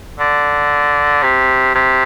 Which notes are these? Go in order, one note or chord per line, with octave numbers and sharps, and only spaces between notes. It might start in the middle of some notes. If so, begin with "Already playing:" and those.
D3
C3
C3